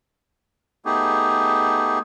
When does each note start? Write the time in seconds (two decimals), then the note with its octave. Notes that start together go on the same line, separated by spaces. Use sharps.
0.85 A3 B3 D#4 G4 G#4